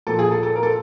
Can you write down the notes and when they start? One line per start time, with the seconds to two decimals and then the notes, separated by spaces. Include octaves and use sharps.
0.07 A#2 F3 A4
0.19 G#4
0.31 A4
0.43 A4
0.55 A#4
0.63 A4